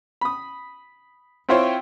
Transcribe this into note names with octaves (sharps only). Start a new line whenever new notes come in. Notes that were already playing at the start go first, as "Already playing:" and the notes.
B5 D#6
C4 E4 F4 C5 C#5 G5